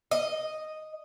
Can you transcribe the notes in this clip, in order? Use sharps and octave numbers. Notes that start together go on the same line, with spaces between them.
D#5